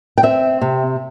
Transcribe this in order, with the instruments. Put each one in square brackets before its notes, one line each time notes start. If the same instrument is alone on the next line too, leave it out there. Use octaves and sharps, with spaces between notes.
[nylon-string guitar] G5
C4 E5
C3